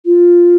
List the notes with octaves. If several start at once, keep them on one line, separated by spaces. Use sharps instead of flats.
F4